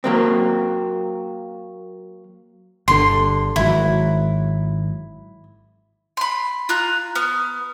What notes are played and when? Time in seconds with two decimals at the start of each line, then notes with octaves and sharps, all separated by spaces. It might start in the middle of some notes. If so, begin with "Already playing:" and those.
0.04 F#3 A#3 C4
2.88 G1 A#2 D3 C6
3.56 G#1 F#3 E4
6.17 B5 C6
6.69 F4 A#5 F#6
7.15 B3 F6